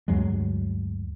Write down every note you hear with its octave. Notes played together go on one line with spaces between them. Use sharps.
D2 G2 F#3 G#3